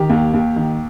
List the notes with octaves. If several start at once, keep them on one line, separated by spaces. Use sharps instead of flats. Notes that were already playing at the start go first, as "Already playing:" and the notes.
Already playing: D#3 G4
D#2
D#2
D#3